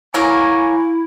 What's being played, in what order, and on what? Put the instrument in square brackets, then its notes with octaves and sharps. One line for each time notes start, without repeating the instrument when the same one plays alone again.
[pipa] F#3 A#3 [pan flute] E4 [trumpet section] G#5 C#6